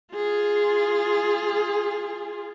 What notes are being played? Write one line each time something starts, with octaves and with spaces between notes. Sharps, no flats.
F4 G#4